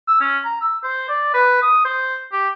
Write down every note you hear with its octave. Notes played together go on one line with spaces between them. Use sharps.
E6
C#4
A#5
E6
C5
D5
B4
D#6
C5
G4